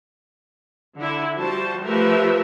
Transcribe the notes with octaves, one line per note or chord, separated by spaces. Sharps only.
D3 E4
F3 G3 F#4 C5 A5
F3 A3 G4 A#4 B4 E5